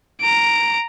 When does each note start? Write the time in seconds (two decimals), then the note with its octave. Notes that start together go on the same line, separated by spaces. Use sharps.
0.21 A#5 D7